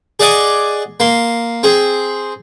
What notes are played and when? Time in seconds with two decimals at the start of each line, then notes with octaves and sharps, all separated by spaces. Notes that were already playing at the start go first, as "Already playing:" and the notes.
0.20 G#4 D5 D#5 F#5 G#5 D6
1.00 A#3 C6
1.63 C4 G#4